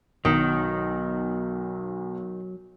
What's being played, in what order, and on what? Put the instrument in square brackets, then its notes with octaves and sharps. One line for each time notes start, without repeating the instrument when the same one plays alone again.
[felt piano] B1 [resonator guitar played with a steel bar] D#3 [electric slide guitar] F#3